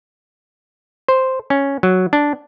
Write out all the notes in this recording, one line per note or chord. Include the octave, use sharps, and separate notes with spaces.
C5
C#4
F#3
D4